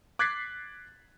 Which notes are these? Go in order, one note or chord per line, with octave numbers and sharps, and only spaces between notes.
D6 F#6 G#6 A6 B6 C7